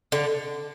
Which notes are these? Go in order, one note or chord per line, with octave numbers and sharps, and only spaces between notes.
D3